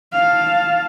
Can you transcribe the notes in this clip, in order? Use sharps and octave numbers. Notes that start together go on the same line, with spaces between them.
F5 A5